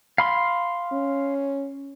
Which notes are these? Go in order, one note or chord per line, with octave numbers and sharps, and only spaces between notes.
F5 B5 C6
C#4